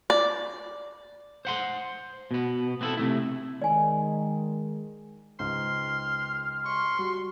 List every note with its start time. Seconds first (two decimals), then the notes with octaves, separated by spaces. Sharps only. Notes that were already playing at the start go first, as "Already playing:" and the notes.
0.10 D5
1.45 C5 F#5 C6
2.31 B2 B3
2.81 B3 C4 E4 G#4 A4
2.97 C3 A3 E4
3.62 D#3 G#3 D5 G#5
5.39 C#2 G#2 C6 F6
6.66 C6 C#6
6.99 G3 F#4